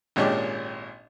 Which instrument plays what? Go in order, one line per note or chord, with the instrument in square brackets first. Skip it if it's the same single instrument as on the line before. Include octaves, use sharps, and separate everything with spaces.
[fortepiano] G#1 A#2 G#3 C#4 D4 G4